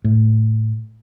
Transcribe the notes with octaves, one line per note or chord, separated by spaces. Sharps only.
A2